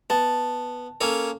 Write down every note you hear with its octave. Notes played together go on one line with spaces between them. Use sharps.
B3 A5
A#3 C#4 A4